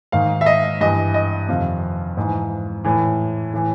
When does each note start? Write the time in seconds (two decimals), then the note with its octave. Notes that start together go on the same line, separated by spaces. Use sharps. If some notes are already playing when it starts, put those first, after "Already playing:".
0.12 G#2 D#3 F5
0.41 E5
0.46 D#5
0.81 G2 E3 D#5
1.14 D#5
1.48 F2 C3 D#3 F5
2.17 G#2 E3
2.85 A2 E3
3.53 A2 E3